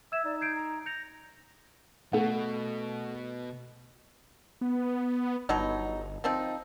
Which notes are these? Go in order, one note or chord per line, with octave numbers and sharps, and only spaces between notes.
E5 E6 G#6 E7
D#4 D5
G6 G#6 C7 D7
A#5
G6 A#6 C#7 F7
B2 A3 F#5
B3
G1 B2 F#3 D#4
F3 C4 D#4